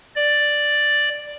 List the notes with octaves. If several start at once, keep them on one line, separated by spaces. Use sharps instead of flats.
D5